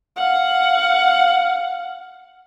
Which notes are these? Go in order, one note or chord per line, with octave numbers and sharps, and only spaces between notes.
F5 F#5